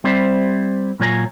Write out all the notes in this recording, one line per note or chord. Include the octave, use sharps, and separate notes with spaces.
G3 C4 E4 G4 C5 D5
A#2 F#3 F4 C#5 G#5 A#5